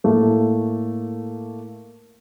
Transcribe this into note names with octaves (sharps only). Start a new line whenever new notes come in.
A2 A3 A#3